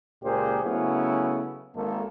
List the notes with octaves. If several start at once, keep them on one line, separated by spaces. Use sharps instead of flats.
C#2 A#2 A#3 G4 G#4 C5
C#3 F#3 A3 B3 C#4 E4
G#1 G#2 D#3 A#3 A4